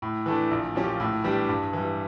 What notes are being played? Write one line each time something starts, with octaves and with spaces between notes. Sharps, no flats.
A2
E3 A3 D4
A#1
A#2 F3 C#4 G4
A2
E3 G3 D4 G4
G2
E3 G3